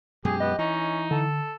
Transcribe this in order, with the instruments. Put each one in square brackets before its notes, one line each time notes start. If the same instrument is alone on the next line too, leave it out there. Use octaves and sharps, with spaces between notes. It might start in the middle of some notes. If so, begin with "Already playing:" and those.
[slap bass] F#2 B2 G#3 [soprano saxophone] G4 [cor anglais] G#4
[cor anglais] B3 [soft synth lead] D#5
[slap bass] E3 [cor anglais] C#4 [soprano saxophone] D#4
[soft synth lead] D3 [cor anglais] A4